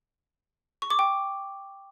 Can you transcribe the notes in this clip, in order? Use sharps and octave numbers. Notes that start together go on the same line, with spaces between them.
C#6
D6
G5